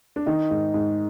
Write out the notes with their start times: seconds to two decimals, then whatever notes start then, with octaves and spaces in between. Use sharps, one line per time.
0.16 D4
0.26 D#3 D#4
0.51 G#2
0.74 G#2